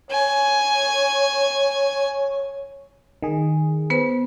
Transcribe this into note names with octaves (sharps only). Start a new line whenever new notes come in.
C#5 G#5
D#3 G#4
B3 B4 C5